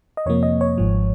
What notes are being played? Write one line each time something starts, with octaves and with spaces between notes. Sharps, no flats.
D#5
F2 C3 F3 A#3 C#5
D#5
C#5
G#1 G#2 F3